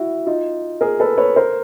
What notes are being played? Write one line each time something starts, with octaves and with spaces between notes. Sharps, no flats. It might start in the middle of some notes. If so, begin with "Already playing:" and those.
Already playing: E4 F#4
D#4 F4
G#4 A#4
A4 B4
B4 C#5
A#4 C5